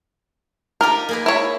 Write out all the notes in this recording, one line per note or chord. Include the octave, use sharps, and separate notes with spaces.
D#4 F4 G4 A#4
A#3 G#4 B4
E4 C#5